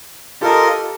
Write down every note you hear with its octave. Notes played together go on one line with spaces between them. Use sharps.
F4 G4 A4 A#4 D#5